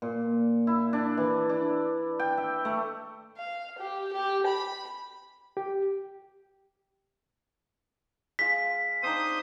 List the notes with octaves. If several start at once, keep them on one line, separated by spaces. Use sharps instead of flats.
A#2
E4
D4
E3
D4
G5
E5
A3
F5
G4
G4
B5
G4
G#3 F4 B6
C4 D4 D#4 C5 D#6